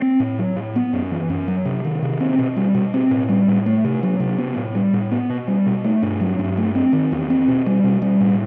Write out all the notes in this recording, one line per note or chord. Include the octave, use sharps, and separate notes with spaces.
C4
A2
F#3
A2
B3
F#2
E3
F#2
F#3
C3
D#3
C3
C4
B2
G3
B2
C4
A2
G3
A2
A3
C3
F#3
C3
B3
A2
G3
A2
B3
B2
G3
B2
A3
G2
F#3
G2
A3
C4
D#3
E2
C4
B2
G3
B2
G3
A2